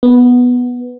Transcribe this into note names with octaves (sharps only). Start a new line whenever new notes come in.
B3